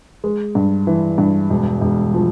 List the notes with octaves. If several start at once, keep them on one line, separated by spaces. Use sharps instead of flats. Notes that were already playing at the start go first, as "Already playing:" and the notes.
G#3
G2
E3
G2
E1
E1
F3